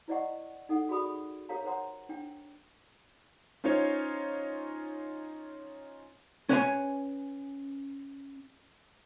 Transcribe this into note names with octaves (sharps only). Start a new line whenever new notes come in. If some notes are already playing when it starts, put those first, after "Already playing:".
E4 C5 D5 D#5 F#5 C#6
D#4 A4 F#5
F#4 G#4 D5 B5 D#6
G4 A#4 C#5 F5 A#5
A#4 C5 C#5 F#5 A#5 C6
D4 G5
C#4 D#4 F4 C5 C#5
C#4 B4 C#5 D#5 G#5 C6